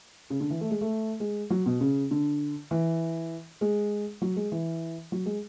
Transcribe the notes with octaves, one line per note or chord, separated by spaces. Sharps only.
C#3
D3
E3
A3
G#3
A3
G#3
F#3
B2
C#3
D3
E3
G#3
F#3
G#3
E3
F#3
G#3